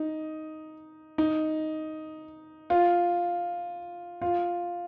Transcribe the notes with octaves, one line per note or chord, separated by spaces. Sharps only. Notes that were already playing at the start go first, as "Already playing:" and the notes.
Already playing: D#4
D#4
F4
F4